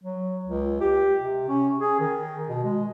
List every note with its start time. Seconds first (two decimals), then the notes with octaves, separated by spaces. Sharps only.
0.04 F#3
0.46 C#2
0.81 G4
1.20 C3
1.49 C#4
1.80 G#4
2.00 D#3
2.48 B2
2.64 G#3